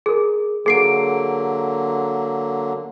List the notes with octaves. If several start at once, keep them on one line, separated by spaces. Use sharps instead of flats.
G#4 A#4
D3 F#3 A#3 G#4 C7 D7